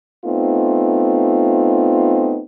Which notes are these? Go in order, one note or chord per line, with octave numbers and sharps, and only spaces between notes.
A3 B3 C4 D#4 F4